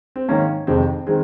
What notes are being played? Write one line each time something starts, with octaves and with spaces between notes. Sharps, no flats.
C4
G#2 D#3 A#3 C#4
F2 C3 D#3 G#3 C4
D#3 G#3 C4